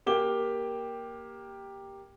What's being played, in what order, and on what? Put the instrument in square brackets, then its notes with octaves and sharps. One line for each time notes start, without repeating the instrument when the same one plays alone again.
[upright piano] A#3 G4 D6 G7